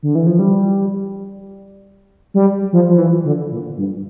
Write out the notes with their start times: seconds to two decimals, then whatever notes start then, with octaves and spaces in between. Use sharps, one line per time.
0.03 D3
0.15 E3
0.26 F3
0.39 G3
2.34 G3
2.73 F3
2.89 F3
2.98 E3
3.25 D3
3.51 A#2
3.77 G2